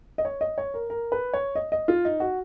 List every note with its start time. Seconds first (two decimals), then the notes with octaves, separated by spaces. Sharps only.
0.18 D#5
0.25 C#5
0.41 D#5
0.58 C#5
0.74 A#4
0.90 A#4
1.12 B4
1.33 C#5
1.55 D#5
1.72 D#5
1.88 F4
2.05 D#4
2.20 F#4